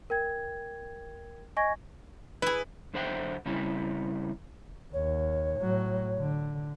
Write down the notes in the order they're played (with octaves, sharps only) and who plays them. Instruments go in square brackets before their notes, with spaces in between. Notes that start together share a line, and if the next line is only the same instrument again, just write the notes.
[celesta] A#4 G5 G#6
D#5 G#5 C#6 G#6 A#6
[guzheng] E4 G#4 [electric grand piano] B4
[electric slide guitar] F#2 D3 C5 E5 F#5 G5
C#3 G3 C4 C#4 E4
[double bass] D#2 [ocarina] C#5
[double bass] A2 F#3
D3